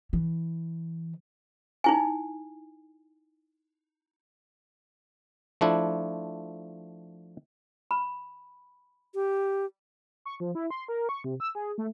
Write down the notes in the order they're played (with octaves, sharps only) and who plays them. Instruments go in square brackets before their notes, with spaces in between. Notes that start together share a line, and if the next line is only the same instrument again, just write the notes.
[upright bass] E3
[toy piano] D#4 E4 G#5
[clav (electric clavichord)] F3 A3 D4 E4
[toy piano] B5
[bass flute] G4
[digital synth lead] C#6
F3
E4
C6
A#4
C#6
C3
E6
G#4
A3